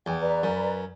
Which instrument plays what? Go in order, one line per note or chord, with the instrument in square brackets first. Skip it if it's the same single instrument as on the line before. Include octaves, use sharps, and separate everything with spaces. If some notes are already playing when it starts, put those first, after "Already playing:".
[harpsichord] E2 [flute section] G5 G#5
[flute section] B4 D5 A#5
[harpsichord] F#2